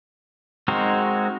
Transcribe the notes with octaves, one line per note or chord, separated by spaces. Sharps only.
G#3 C4 D#4 F#4 A#4